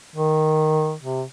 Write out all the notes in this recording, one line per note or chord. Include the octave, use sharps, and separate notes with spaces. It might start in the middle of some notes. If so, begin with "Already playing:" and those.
D#3
C3